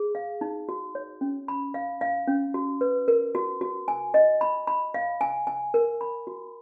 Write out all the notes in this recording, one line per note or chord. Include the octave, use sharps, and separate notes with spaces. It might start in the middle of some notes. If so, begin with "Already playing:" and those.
Already playing: G#4
F5
D#4
F#4
C#5
C#4
B5
F5
F5
C#4
F#4
B4
A#4
F#4
F#4
G#5
D#5
B5
B5
F5
G#5
G#5
A#4
B5
F#4